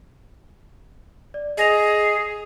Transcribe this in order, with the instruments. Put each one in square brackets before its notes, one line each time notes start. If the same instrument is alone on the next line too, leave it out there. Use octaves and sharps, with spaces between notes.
[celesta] D5
[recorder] G#4 [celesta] D#5 A#6 F7